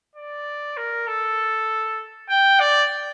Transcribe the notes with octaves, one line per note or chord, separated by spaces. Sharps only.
D5
A#4
A4
G5
D5